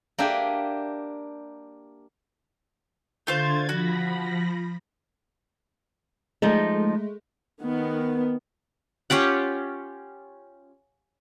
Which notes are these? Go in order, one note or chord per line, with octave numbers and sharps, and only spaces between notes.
A#3 D4 G4 E5 G5 G#5
D3 A3 F4 C5 G#6 A6
F3 F#4 B5 A#6
F3 G#3 A3 D#4
D#3 B3
C#4 F4 G4 F#5